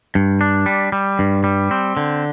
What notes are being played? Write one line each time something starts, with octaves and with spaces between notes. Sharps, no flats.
G2
D4
G3
G3
G2
G3
C4
D3